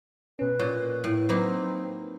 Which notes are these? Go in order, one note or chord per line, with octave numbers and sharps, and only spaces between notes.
B2 C#4 B4
A#2 C#5
A2
F#3 A#3 C4 D#4 B4 C5